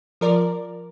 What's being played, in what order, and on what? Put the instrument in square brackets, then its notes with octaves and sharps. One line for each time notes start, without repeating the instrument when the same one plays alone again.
[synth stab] F3 A#4 D5